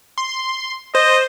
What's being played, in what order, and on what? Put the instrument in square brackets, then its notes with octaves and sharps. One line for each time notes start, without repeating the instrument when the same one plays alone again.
[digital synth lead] C6
[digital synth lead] C5 [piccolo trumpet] D#5